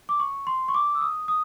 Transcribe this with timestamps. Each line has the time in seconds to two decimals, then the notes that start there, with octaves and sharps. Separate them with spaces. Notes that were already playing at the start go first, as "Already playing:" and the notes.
0.09 D6
0.20 C#6
0.47 C6
0.68 C#6
0.74 D6
0.95 E6
1.01 D#6
1.28 D#6